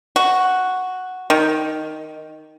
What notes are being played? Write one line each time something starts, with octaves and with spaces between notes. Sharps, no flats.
F#4
D#3